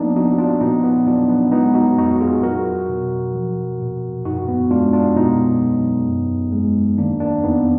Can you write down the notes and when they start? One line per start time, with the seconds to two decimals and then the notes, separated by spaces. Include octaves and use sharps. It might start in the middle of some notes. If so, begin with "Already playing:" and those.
Already playing: F3 A#3 B3 D4 D#4
0.16 F3 D#4 F#4
0.38 D4 F4
0.61 A#2 B3 D#4
0.84 B3
1.07 F#3 D4 F4
1.29 B3
1.52 G#3 B3 D#4
1.74 D#4 F#4
1.97 F2 D#4 F#4
2.20 F4 G#4
2.43 F#3 F#4 A#4
2.89 B2
3.34 F3
3.80 A#2
4.25 F#2 D#4 F#4
4.48 B3
4.70 G#3 D4 F4
4.93 D4 F4
5.16 B2 B3 D#4
5.62 F#3
6.07 F#2
6.52 G#3
6.98 D#3 A#3 D4
7.20 A#3 D4
7.44 F2 B3 D#4